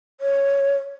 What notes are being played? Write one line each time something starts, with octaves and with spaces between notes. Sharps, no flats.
C#5